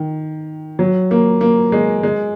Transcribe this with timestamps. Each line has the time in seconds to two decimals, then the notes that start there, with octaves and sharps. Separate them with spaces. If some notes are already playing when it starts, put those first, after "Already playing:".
Already playing: D#3
0.79 F#3
1.11 A#3
1.41 A#3
1.72 G#3
2.03 G#3